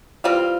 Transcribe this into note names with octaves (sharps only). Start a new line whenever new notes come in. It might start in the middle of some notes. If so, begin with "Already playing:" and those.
E3 G3 C4 F4